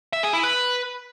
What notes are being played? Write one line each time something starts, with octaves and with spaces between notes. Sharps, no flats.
E5
G#4
E4
B4